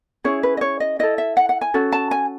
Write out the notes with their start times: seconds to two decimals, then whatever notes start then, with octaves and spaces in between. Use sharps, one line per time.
0.24 C#4 E4 G#4 C#5
0.43 B4
0.57 D#5
0.61 C#5
0.80 D#5
0.99 E4 A4 D#5
1.18 E5
1.37 F#5
1.49 F#5
1.61 G#5
1.74 C#4 F#4 A4
1.92 A5
2.11 G#5